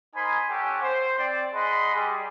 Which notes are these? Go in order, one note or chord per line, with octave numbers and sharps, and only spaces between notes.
D#4 A#4 C5 G#5 B5 C6
C#4 G4 A4 C#5 F#5 G#5
C5
C4 D5 G5
G#4 D#5 F#5 B5 C6
G3 G#4